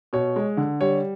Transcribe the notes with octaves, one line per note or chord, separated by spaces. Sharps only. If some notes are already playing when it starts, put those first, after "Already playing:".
B2 C#5
G#3
D3
G3 C#5